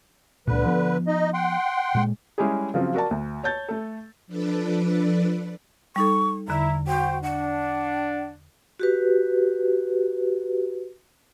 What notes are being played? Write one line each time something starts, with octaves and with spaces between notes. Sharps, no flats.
C#2 A#2 D3 B4
F3 B3
D#4 D#5
F#5 G5 C6
A#2 G#3
G3 G#3 C#4 E4 G4 G#4
C#3 F3 F#3 C4
F#4 A#4 D5 A5
D2
C#5 A5 G6 A6
A3 A4
F3 D4 A4 B4 D5
G3 D#4 A4 C#6
E2 D3 E4 A#5
F#4 C5 G5
D4 F#5
F#4 G4 B4